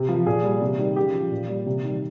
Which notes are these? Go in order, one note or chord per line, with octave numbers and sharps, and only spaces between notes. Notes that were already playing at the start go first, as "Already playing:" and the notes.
Already playing: C3
F3
A#2 G#4
G3
C3
D#3 G3
C#3 G4
F3
A#2
G3
C3
D#3 G3